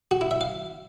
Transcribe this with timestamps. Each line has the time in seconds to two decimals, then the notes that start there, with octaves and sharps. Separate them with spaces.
0.11 F#4
0.21 E4
0.31 E5
0.41 F5